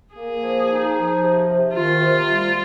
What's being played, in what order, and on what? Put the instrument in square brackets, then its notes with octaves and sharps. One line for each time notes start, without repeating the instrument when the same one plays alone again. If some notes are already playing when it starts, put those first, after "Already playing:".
[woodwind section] A#3 [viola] G#4
[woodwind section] F3
D#4
F3
C3
C3
[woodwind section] D#3 [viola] F4
[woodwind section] C3
G3